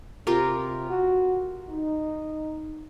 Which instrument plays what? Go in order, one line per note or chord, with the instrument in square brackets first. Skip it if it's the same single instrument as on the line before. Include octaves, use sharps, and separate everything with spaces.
[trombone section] C3 [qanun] F4 G4 A#4
[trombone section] F#4
D#4